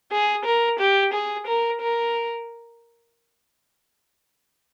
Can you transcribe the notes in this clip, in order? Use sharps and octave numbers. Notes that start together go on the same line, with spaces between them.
G#4
A#4
G4
G#4
A#4
A#4